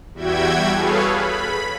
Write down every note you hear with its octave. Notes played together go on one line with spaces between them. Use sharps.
E2 G3 F#4 E5 G5 G#6
G#4 A4 B4 C#5 F5
B5